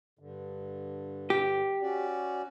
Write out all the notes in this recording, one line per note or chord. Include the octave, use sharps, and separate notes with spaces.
G2 D3
G4
C#4 F#4 D5